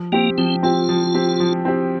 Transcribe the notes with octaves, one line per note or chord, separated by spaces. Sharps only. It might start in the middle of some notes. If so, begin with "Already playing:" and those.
Already playing: F3
A#3 C4 G4
F3 C4
C4 F4 G4
F3
C4 G4
F3
C4 G4